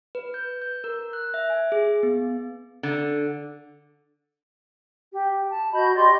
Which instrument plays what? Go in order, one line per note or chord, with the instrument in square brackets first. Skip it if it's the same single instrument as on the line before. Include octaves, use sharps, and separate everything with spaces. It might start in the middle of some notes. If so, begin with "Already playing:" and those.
[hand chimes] B4
G6
G6
A#4
F#6
E5
G#5
G#4
B3
[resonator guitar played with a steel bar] D3
[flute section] G4
A5
F#4 D#5 B5 G6
G4 D5 D#5 C6